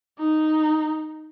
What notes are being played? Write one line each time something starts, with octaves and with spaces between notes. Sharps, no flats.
D#4